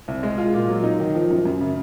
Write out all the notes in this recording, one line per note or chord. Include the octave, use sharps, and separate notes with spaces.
C2
G#3
F4
A#2
F#3
D#4
D#3
F3
F#2
F#2
C#3